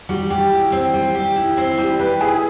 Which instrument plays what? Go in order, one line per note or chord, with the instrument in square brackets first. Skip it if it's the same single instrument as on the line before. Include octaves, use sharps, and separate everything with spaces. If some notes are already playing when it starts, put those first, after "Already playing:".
[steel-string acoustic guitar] G3 [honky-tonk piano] F#4
[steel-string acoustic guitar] G4
E4
C4
G3
G4
E4
C4
[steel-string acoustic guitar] G3 [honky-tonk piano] G4
[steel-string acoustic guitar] G4 [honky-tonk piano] B4
[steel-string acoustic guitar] E4 [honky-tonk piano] G#4